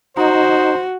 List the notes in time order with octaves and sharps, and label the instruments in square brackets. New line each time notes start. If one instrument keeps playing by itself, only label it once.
[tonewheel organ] D#4 [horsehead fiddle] F#4 [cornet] C5